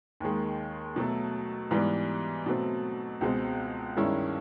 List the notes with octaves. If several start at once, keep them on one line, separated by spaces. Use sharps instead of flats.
D#2 D#3 G#3
B2 F#3 A3
G#2 E3 G3 B3
B2 F#3 A3 C4
C#2 B2 G#3 C4
G2 D#3 G#3 C#4 E4